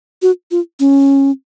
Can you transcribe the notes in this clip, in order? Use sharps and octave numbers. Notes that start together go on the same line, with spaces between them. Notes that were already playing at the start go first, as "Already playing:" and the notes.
F#4
F4
C#4